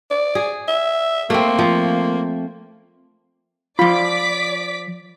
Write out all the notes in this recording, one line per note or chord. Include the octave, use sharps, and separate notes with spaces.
D5
G#4
E5
A3 A#3 C4
F3
F3 F4 D5 B5 D6 B6